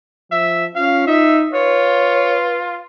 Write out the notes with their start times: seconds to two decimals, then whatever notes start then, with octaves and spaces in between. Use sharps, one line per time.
0.32 F3 E5
0.75 C#4 F4 F5
1.07 D#4 E5
1.53 F4 B4 C#5